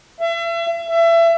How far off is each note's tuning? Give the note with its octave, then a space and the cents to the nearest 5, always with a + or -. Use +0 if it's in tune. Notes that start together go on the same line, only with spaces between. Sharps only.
E5 +40
E5 +30